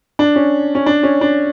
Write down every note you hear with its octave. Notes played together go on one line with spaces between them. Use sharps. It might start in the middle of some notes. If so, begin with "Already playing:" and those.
D4
C#4
C#4
D4
C#4
D4